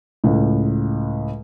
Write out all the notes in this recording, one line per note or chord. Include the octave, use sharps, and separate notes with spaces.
C#2 A2